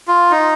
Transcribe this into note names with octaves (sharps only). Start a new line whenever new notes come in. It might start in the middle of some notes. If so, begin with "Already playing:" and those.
F4
D#4